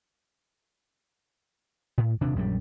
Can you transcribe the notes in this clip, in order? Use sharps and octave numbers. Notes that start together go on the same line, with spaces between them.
A2
D#1 C3 D4
A#1 F#2 G3